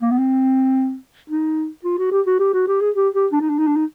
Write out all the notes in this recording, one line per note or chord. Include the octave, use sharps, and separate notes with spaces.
A#3
B3
C4
D#4
F4
F#4
G4
F#4
G4
F#4
G4
G#4
G4
G4
D4
D#4
D4
D#4
D4
D#4